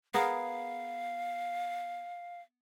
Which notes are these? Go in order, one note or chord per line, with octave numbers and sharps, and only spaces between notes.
B3 G#4 A#4 F5